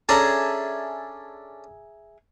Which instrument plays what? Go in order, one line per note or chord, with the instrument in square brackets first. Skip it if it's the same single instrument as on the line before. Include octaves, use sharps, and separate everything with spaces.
[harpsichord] C#4 D4 A4 [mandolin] G#4 E5 A#5